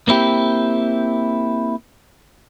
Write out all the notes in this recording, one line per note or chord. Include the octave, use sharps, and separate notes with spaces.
A#3 C4 E4 G4